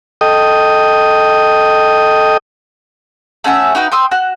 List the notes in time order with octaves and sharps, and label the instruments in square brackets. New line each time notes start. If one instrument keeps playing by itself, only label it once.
[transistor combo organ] A4 D#5 G5 D#6
[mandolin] A3 C#4 F#4 E5
D#4 F#4 B4 G5
G5 C6 D#6 E6
F#4 F#6